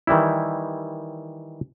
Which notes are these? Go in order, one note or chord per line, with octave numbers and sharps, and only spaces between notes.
D#3 E3 G3 E4